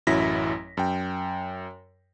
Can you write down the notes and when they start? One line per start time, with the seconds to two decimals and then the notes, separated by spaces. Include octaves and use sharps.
0.07 A1 F#2 F#3 E4 A#6 B6
0.77 F#2 G5